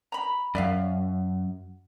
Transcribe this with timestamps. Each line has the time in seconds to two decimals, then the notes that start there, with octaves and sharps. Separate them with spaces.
0.12 A#5 B5
0.55 F#2 D5 E5 F5